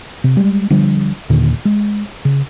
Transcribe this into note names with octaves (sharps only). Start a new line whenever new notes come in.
C3
G3 G#3
D3 F3 G3
D#2 A#2 D3 D#3
G#3
C#3